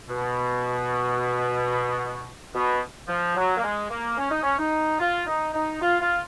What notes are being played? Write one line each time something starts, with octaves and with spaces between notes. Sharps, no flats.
B2
B2
F3
F#3
A#3
G#3
A#3
C#4
D#4
C#4
D#4
F4
D#4
D#4
F4
F4